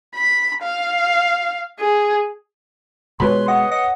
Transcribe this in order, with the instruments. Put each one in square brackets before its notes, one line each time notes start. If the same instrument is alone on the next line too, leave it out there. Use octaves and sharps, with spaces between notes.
[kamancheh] B5
F5
G#4
[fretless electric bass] B2 G#3 [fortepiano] B4 C#5 B5 [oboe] C6
[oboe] D#5 [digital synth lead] F#5
[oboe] D#5 [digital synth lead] F#5